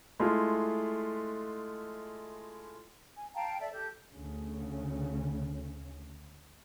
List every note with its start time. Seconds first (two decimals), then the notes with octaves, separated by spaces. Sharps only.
0.20 G#3 A3 E4 F4
3.16 G#5
3.34 F5 G5 A5 A#5
3.60 A4 D5 E5
3.72 G4 A4 G6
4.12 D2 C#3 C#4